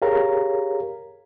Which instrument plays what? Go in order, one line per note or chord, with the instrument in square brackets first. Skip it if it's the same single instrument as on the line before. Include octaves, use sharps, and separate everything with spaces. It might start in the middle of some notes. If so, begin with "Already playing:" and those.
[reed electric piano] G4 G#4 A#4 C#5 F5 A#5